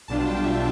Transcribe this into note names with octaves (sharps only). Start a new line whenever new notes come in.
B1 B2 G3 D4 F4 A5
G5
E5